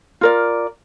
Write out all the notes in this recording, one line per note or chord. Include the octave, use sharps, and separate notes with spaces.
F4 A#4 D5